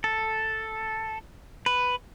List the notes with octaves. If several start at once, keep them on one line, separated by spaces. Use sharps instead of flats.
A4
B4